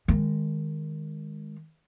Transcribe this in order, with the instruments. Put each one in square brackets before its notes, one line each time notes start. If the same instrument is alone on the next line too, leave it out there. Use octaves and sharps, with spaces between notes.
[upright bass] D#3 G#3